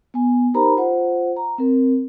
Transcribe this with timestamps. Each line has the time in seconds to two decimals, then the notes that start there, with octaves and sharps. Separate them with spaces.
0.14 B3 G#5
0.54 D#4 G4 A#4 C5 A#5 B5
0.77 F4 C5 F#5
1.37 A#5
1.58 C4 A#4